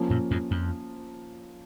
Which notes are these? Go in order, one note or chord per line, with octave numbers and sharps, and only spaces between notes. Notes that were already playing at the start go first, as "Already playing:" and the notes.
Already playing: F3 A#3 C#4
F#2 A#2
F2 G#2
F2